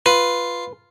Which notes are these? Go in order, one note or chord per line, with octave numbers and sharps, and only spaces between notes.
F4 B4